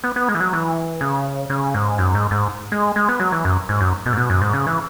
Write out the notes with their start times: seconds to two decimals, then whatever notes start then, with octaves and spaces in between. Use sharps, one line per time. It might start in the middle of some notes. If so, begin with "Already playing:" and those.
0.04 B3
0.16 B3
0.29 G#3
0.35 E3
0.40 F#3
0.53 E3
1.01 C#3
1.50 C#3
1.74 G#2
1.98 F#2
2.15 G#2
2.31 G#2
2.72 G#3
2.96 G#3
3.09 B3
3.20 F#3
3.32 E3
3.45 F#2
3.69 G#2
3.80 F#2
4.06 B2
4.13 G#2
4.17 B2
4.30 F#2
4.41 G#2
4.53 C#3
4.67 E3